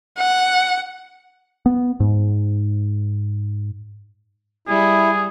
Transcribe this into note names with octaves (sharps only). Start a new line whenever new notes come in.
F#5
B3
G#2
G3 E4 G#4